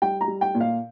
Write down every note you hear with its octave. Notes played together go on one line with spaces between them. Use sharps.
G3 G5
A#5
G3
G5
A#2
F5